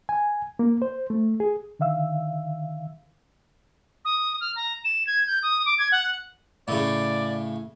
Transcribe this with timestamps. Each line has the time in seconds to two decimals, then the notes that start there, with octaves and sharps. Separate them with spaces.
0.09 G#5
0.59 A#3
0.82 C5
1.10 A3
1.40 G#4
1.79 D3 D#3 E5 F5 E6
4.05 D#6
4.41 F6
4.56 A#5
4.84 E7
5.07 G#6
5.27 G6
5.43 D#6
5.66 D6
5.78 G#6
5.92 F#5
6.68 A2 C#3 D5